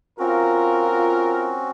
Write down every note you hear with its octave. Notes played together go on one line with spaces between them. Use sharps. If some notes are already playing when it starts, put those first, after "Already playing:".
C4 C#4 F4 F#4 A#4